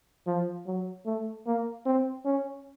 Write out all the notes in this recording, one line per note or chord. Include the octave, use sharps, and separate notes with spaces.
F3
F#3
A3
A#3
C4
C#4